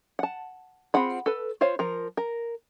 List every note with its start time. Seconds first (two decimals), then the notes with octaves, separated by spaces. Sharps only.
0.19 F#5 A5
0.94 C4 F4 G#4 F#5 B5
1.26 A4 B4
1.61 F4 C5 C#5 F5
1.79 F3 A#4
2.17 A#4